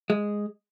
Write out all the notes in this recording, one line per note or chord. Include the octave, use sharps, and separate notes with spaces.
G#3